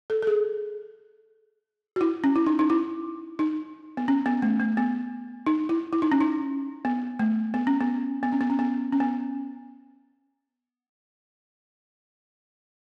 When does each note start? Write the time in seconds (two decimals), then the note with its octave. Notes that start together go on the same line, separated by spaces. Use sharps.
0.10 A4
0.22 A4
0.27 G#4
1.96 F#4
2.01 E4
2.24 C#4
2.36 E4
2.47 D#4
2.59 D#4
2.70 E4
3.39 D#4
3.97 B3
4.08 C#4
4.26 B3
4.42 A3
4.60 A3
4.77 B3
5.46 D#4
5.69 E4
5.93 E4
6.02 D#4
6.12 C#4
6.21 D#4
6.85 B3
7.19 A3
7.54 B3
7.67 C#4
7.80 B3
8.23 B3
8.32 C#4
8.41 B3
8.50 C#4
8.59 B3
8.92 C#4
9.00 B3